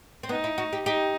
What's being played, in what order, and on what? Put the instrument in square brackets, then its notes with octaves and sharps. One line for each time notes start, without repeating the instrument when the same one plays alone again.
[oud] C4
[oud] B3 [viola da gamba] D#4
[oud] E4
F#4
G4
[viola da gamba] D#4 [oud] G4